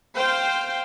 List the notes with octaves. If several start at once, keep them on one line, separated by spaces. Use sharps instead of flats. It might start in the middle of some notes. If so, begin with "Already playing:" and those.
C5 F5 G5